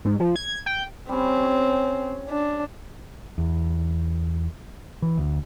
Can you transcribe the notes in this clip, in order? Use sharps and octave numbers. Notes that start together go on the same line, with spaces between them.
G#2
F3
G#6
G5
G3 C4 C#4
C#4
D4
E2
E3
D2